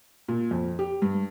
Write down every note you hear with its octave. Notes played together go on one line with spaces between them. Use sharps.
A#2
F2
G4
G2